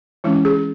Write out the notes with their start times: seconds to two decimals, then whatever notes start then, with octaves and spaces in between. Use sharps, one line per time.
0.24 E3 G#3 C#4 E4
0.45 G#4